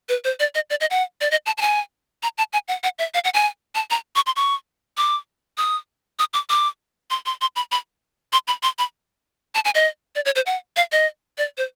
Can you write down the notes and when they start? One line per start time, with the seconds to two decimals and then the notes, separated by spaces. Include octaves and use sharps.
0.09 B4
0.24 C5
0.40 D5
0.55 D#5
0.70 D5
0.81 D#5
0.90 F#5
1.21 D5
1.31 D#5
1.46 A5
1.58 A5
1.62 G#5
2.23 A#5
2.38 A5
2.53 G#5
2.68 F#5
2.84 F#5
2.99 E5
3.14 F5
3.24 F#5
3.34 G#5
3.75 A5
3.90 A#5
4.16 C#6
4.26 C6
4.36 C#6
4.97 D6
5.58 D#6
6.19 D#6
6.34 D6
6.49 D6
7.10 C6
7.26 C6
7.41 C6
7.56 B5
7.72 B5
8.33 C6
8.48 B5
8.63 C6
8.79 B5
9.55 A5
9.65 G#5
9.75 D#5
10.15 D5
10.25 C#5
10.36 C5
10.46 F#5
10.77 F5
10.92 D#5
11.38 D5
11.57 C5